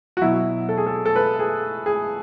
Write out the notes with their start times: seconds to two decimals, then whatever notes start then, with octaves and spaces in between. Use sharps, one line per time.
0.17 F#4
0.21 B2 F#3 E4
0.69 A4
0.77 G#4
0.87 A4
1.05 A4
1.16 B4
1.39 G#4
1.86 G#4